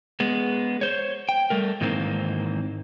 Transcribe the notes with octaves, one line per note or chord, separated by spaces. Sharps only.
G#3 B3
C5 C#5
G5
G3 A3 A#4
G#2 D#3 E3 A#3 C4